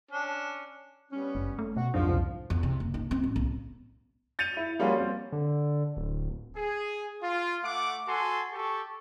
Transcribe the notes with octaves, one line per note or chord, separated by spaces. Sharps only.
C#4 D4
G3 B3 C#4
F#1
A3
B2 F#4
B1 F2 G#2 D#3 F3 D4
C2
E2
C3
F#1
D#4
C4
A1
B1
G6 A6 C#7 D#7 F7
E4 F7
F3 G3 A#3 C#4 F4 F#4
C4
D3
D1
G#4
F4
A3 F#5 D6
F#4 A4 G#5 C6
G4 A4 C#6